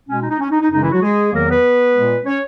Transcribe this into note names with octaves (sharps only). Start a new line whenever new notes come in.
B2 G#3 C#4
D#4
D#4
C#4
D#4
D#4
F#2 C#3 G#3 D#4
E3 E4
F#3 F#4
G#3 G#4
E2 D#3 F#3 A#3 A#4
B3 B4
A#2 G#3
C#4 C#5